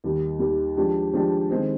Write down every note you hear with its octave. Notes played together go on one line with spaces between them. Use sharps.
D#2 D#3 G3
D#2 D#3 G3
F3 G#3 D4 G4
F3 G#3 D4 G4
D#3 G#3 C4